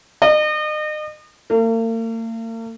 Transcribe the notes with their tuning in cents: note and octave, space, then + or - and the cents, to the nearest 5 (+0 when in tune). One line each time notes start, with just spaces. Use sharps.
D#5 -35
A#3 -45